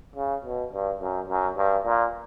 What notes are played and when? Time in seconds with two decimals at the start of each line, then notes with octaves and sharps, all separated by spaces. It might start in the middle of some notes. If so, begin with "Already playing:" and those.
0.16 C#3
0.45 B2
0.73 G2
1.01 F#2
1.29 F#2
1.57 G2
1.85 A#2